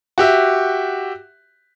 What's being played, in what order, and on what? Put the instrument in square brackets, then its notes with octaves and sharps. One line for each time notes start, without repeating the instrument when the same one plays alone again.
[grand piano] F#4 G4 E5